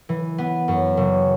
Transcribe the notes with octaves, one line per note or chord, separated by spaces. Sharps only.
E3
B3
F#2
F#1